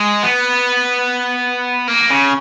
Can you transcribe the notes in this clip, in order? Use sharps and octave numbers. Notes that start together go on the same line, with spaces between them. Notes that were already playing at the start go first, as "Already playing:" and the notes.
Already playing: G#3
B3
A#3
C#3